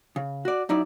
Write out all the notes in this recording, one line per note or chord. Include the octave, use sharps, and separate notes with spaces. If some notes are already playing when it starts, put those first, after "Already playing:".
C#3
F#4 D5
F#2 D#4 E4 D5